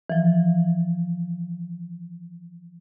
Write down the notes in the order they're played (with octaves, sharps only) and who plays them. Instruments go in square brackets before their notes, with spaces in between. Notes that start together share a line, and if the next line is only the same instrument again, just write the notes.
[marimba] E3 F3